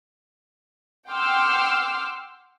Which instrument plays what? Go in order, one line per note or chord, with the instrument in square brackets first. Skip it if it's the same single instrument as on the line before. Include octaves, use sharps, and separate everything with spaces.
[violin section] F#5 G5 C6 D6 E6 F6